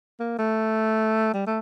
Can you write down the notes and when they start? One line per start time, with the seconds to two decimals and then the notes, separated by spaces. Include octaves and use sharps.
0.20 A#3
0.39 A3
1.34 G3
1.46 A3